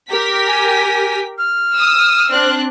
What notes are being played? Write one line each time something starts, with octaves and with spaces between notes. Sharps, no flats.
G4 A#4 B6
G#5
F6
D#6 E6
C4 D4 F#6